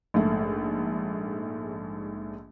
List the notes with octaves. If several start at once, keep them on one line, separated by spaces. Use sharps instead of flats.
A#1 G#2 A3